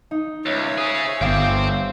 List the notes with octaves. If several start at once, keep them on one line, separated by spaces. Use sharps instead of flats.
D#4
C#2 C#5 E5
C#4 G#4 C5
G1 C5 F5 G5 D6 D#6